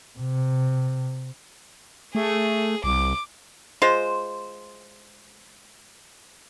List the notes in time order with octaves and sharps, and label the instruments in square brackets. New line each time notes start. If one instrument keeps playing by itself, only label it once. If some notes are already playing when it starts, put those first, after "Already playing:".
[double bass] C3
[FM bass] A3 [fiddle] G#4
[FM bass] C2 [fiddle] D6
[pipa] G#3 F4 C5